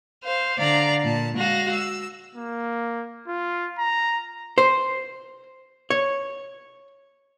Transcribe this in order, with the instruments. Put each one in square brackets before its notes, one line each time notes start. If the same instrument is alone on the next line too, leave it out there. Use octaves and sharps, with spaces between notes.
[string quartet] C5 F5
D3 D5 F5 A#5
A#2 A5
G#3 F#4 F5 A#6
E6
[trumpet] A#3
F4
A#5
[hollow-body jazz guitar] C5
C#5